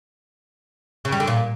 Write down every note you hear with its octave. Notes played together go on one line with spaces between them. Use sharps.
C#3
G3
D3
A#2